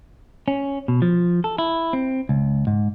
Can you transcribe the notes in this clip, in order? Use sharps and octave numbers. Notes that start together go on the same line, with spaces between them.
C#4
B2
F3
A4
E4
C4
C#2
G#2